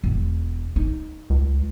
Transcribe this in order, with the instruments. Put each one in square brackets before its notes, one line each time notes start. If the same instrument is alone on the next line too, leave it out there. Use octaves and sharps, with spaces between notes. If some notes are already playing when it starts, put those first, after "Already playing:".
[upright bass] E1
D#4
[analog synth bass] C#2